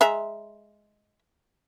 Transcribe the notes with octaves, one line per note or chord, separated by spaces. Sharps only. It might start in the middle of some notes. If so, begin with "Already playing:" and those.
G#3 E5 A#5